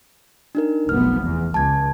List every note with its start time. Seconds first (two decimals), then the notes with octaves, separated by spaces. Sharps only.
0.55 D4 D#4 A#4
0.89 F1 B1 B3 F6
1.22 E2
1.54 C#2 A5 G#6